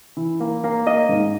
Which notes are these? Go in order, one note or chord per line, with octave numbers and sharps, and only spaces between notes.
E3
A#3
A#3
A#3 D#5
G#2